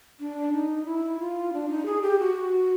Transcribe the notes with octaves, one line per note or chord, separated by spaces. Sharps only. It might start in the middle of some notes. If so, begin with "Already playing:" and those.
D4
D#4
E4
F4
D4
D#4
G#4
G4
F#4